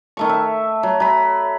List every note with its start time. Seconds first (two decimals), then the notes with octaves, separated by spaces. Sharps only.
0.17 D#3 A3 C#6
0.29 E5
0.83 F#3
1.00 F#3 B5